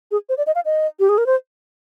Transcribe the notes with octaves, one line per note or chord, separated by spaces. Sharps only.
G#4
C5
D5
D#5
F5
D#5
G4
G#4
A#4
C5